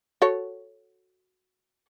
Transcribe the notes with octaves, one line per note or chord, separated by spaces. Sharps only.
F#4 A4 C#5